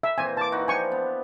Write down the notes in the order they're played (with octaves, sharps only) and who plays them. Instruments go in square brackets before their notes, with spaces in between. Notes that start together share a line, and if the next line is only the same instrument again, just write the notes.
[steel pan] E5
[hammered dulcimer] A#2 E3 C4 [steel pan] G#5
[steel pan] A5 D6
[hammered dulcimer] D#4 F#4 B4
[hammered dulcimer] F3 D4 G4 [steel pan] G#5 C#6
[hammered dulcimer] B3